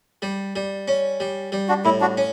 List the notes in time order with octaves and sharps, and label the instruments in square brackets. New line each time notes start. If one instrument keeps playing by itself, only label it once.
[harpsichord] G3
G3
C#4
G3
G3
[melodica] D4 F#4
[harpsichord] A2 [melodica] E4
[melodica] D4 F#4
[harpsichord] C#4